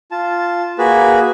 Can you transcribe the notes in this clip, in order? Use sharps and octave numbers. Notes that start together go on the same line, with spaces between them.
F4 A5
A#3 F#4 G#4 B4